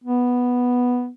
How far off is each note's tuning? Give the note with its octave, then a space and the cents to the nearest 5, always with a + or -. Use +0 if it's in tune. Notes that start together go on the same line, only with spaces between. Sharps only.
B3 -5